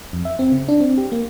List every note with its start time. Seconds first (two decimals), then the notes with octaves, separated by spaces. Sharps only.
0.13 F2
0.25 E5
0.39 C4
0.52 C#3
0.68 D4
0.81 C4
0.98 G4
1.12 A#3